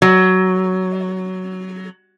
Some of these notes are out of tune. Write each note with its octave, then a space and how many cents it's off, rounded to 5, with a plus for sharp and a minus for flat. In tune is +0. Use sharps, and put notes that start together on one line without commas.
F#3 +10